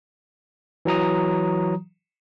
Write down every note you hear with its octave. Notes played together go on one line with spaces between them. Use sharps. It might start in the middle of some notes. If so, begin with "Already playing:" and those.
E3 F#3 A#5 D#6